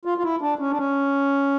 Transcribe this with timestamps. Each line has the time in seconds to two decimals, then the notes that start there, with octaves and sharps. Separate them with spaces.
0.05 F4
0.18 F4
0.23 E4
0.41 D4
0.59 C#4
0.71 D4
0.77 C#4